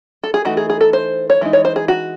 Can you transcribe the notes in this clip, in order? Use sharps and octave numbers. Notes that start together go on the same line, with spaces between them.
A4
G#4
E3 A3 D#4 F#4
G#4
G#4
A4
C5
C#5
E3 G#3 D#4
C#5
C5
G#4
F#4